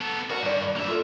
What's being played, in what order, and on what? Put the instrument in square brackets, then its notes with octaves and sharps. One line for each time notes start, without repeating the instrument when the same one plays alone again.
[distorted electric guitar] B3 A4
[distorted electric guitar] F#4 [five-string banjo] A#4 A#5
[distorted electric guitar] G2 [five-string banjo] D#3 D5
[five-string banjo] G3 D4 [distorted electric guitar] A#3 E5
[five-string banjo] F4 A4 A#4